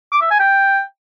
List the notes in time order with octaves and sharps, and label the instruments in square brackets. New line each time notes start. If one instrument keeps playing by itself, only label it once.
[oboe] D6
E5
G#5
G5